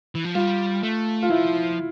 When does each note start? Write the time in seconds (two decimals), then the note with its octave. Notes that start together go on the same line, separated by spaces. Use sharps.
0.15 E3
0.25 F3
0.35 G3 F4
0.83 A3
1.22 F4
1.30 F3 E4